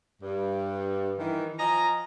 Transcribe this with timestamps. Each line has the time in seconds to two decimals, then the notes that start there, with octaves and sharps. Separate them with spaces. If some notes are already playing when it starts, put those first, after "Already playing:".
0.21 G2
1.18 D#3 E3
1.59 F3 D#5 G#5 A#5